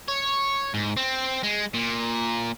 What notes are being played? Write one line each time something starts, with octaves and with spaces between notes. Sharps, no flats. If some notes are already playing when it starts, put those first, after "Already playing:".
C#5
G#2
C4
G#3
A#2